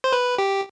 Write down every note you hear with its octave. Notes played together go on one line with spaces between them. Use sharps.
C5
B4
G4